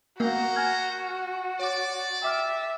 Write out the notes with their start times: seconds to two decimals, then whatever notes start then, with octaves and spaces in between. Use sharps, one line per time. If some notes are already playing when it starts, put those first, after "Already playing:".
0.20 A#3 F#4 C5 A#5
0.56 G#5 F6 G#6
1.59 C#5 D5 D6
2.22 E5 G5 D6 F6